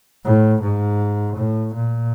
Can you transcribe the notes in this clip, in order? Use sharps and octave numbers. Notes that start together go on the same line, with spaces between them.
A2
G#2
A2
A#2